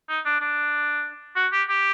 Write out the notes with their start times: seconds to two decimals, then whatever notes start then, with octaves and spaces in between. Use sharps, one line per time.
0.09 D#4
0.25 D4
0.41 D4
1.36 F#4
1.52 G4
1.69 G4